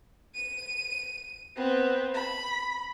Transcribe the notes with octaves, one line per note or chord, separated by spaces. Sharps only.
D#7
B3 C4
B5